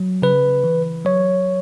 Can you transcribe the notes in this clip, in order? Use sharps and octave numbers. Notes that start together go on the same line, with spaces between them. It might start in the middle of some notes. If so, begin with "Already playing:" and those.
Already playing: F#3
C#3 B4
E3
F#3 C#5